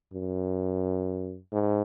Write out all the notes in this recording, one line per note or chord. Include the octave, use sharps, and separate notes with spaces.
F#2
G#2